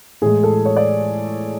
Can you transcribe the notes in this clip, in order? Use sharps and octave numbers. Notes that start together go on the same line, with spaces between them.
A2 E3 G#3 G#4
A4
C#5
D5